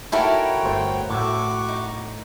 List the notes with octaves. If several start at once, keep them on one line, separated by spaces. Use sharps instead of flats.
D#4 E4 F#4 A4 A#4 C#5 G5
G1 A3 C5
A2 F#4 E5 C#6 D6
D#4